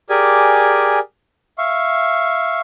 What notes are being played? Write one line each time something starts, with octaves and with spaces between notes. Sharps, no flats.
G4 G#4 A#4 D5 G#5
E5 F5 C#6